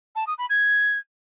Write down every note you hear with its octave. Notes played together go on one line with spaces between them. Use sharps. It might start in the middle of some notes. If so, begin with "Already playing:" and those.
A5
D#6
B5
G#6